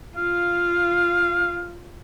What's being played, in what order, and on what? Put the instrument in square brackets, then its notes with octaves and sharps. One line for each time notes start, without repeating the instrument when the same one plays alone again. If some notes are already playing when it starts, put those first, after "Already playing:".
[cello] F4 [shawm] F5